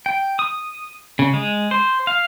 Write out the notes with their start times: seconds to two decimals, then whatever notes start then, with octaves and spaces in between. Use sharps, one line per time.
0.06 G5
0.39 D#6
1.19 C#3
1.33 G#3
1.71 C5
2.07 F5